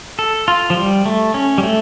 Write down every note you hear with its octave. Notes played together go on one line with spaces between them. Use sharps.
A4
F4
F3
G3
A3
C#4
G3
A3